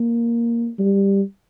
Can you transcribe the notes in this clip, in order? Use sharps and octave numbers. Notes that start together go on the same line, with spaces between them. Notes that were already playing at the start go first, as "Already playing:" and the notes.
Already playing: A#3
G3